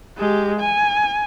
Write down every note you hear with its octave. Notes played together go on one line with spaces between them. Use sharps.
G#3 G4
G#5